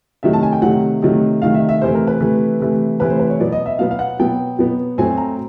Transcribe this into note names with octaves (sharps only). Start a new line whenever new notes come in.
C3 D#3 F#3 A3 E5
A5
G#5
G5
C3 D#3 F#3 A3 F#5
C3 D#3 F#3 A3
C3 D#3 F#3 A3 F5
E5
E5
C3 E3 A3 C5
A#4
B4
C3 E3 A3
C3 E3 A3
C3 E3 A3 B4
C5
B4
C#5
B2 F#3 B3 D5
D#5
E5
B2 F#3 B3 F5
F5
F#5
B2 F#3 B3 G5
B2 F#3 B3
A2 F#3 A3 C4 G#5
A#5